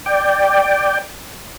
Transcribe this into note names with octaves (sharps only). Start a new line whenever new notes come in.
D5 G5